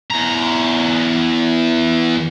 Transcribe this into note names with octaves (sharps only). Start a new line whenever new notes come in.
E2 A#5